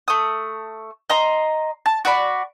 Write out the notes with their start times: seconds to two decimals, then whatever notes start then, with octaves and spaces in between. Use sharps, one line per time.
0.08 A3 D#6
1.10 D#5 A#5 C6
1.86 A5
2.05 F#4 D5 B5